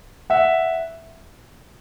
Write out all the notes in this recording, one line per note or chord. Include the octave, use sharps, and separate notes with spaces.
E5 F#5